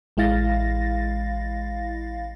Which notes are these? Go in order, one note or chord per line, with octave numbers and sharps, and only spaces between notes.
A1 G#3 E4 F5 A6 A#6